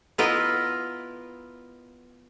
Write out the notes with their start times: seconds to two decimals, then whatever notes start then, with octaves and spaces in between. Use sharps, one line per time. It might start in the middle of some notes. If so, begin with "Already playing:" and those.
0.18 B3 E4 F4 A#4 B4 D#5